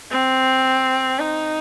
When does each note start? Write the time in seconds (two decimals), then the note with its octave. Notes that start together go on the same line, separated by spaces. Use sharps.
0.11 C4
1.19 D#4